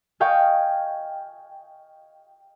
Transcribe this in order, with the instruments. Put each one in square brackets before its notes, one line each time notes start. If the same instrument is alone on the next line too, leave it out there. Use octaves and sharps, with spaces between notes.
[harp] D#5 F5 G5 G#5 C#6